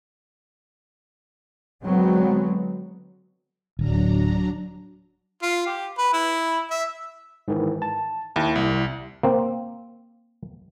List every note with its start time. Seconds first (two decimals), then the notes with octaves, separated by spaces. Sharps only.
1.84 D3 F#3 G#3 B3 C4
3.79 D1 F#3 D4 A#5
5.42 F4
5.67 G4
5.98 B4
6.13 E4
6.70 E5
7.48 G#2 D#3 E3
7.82 A5
8.36 D#2 E4
8.56 C2
9.23 A#3 C4